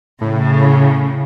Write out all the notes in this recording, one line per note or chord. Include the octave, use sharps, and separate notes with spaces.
A2 C#3